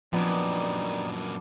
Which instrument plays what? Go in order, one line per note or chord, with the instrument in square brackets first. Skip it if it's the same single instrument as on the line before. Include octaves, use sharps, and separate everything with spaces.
[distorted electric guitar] F#2 A#2 [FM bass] F3 [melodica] G3 D#4 [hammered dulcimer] B3 D4